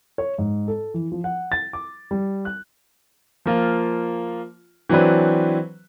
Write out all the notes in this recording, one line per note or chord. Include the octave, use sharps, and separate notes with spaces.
C#5
G#2
A4
E3
F3
F#5
A6
D6
G3
F#6
F3 A#3 F4
E3 F#3 C4 D4 B4